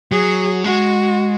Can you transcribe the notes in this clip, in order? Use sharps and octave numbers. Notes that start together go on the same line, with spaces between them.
F#3 G#4
G#3 F#4